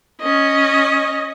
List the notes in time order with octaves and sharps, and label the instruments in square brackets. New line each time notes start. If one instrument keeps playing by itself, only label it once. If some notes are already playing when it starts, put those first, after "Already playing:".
[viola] C#4 D#5